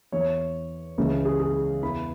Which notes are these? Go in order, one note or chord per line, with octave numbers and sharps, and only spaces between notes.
E2 E3 C#5
C#2 C#3 E3
G#4
G#4
E2 E3 B5